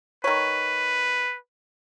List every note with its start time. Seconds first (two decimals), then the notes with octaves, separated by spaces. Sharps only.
0.24 D#3 B4 C#5